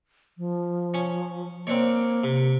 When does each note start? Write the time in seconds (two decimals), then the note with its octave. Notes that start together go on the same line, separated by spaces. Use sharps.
0.38 F3
0.94 C#4
1.67 A#3 C4 D4 C#5
2.24 C3